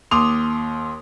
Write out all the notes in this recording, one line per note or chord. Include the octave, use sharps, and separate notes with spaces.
D#2 C6 D6 D#6 F7